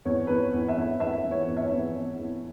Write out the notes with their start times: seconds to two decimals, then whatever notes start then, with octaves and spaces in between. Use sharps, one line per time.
0.05 E2 C#5
0.27 E2 B4
0.37 C#5
0.53 E2
0.68 E5
0.77 E2
1.00 E2 E5
1.24 E3
1.31 C#5
1.47 E2
1.57 E5
1.64 C#5
1.71 E2
1.95 E2
2.18 E2